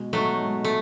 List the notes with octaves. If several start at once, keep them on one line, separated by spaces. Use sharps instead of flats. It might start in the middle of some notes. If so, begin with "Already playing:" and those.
Already playing: B2 G#3
B2 F#3 G#3 A3 D#4
B2 G#3 D#4
A3